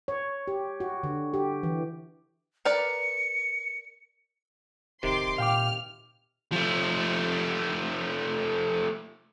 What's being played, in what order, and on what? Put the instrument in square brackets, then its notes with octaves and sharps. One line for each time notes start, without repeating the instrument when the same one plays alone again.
[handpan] C#5
G4
F#4
D3
G4
E3
[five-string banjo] A#4 B4 D5 [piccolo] C#7
[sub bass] D1 [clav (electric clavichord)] C3 D#3 [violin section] C6 D6
[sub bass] A#2 [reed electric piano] F5 G5 D6 [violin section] F6
[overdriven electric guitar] F3 A3